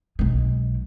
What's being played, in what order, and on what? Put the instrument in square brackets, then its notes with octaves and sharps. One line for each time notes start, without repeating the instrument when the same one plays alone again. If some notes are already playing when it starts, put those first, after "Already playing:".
[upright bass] B1 G#3